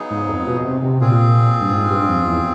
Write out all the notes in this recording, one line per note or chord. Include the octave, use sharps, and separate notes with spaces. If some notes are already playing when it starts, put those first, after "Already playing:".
Already playing: C#3 F#3 B3 D#4 G#4
G#2
F2
B2
C3
C3
A#2 C4 F4 G#4
G2
G#2
G2
F2
E2